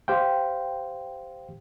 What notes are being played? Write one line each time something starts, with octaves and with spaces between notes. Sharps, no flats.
G4 C5 F5 G5